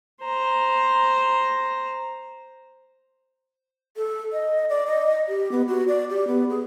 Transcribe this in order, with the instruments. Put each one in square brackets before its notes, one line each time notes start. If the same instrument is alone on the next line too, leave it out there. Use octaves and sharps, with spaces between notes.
[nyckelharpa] C5 A#5
[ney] A4
D#5
D5
D#5
G4
B3
F#4
D5
G4
B3
G#4